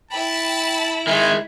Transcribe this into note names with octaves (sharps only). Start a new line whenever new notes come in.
E4 G5 A5 B5
D#3 G#3 E5 G#5